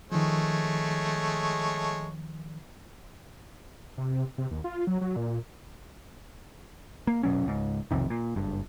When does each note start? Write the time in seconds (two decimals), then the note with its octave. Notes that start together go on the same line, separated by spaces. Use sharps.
0.12 D#3 F3 G#3 A3 C#5
3.98 C3
4.38 C3
4.51 D#2
4.64 F4
4.87 F#3
5.01 F#3
5.16 A#2
7.07 A#3
7.23 F1 B2 F#3 C#4
7.46 C#2 G#2
7.91 B1 F2 C3 D#3
8.10 A#2
8.36 F#1 G2